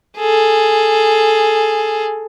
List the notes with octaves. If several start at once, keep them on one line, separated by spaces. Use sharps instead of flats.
G#4 A4